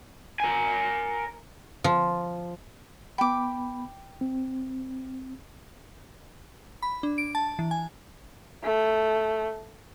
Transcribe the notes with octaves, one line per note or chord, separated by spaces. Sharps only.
A#4 G#5
F3
B3 G5 B5 D6
C4
B5
D4
D7
A5
E3
G#5
A3